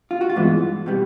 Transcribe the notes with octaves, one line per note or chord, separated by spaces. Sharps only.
F4
F#4
F4
G2 E3 G#3 B3
B2 G3 B3